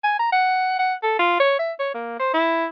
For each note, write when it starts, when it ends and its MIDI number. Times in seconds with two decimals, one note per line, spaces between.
0.04 0.15 80
0.20 0.28 82
0.32 0.78 78
0.79 0.95 78
1.03 1.17 69
1.19 1.38 65
1.40 1.58 73
1.59 1.73 76
1.79 1.89 73
1.94 2.15 58
2.19 2.31 72
2.34 2.66 64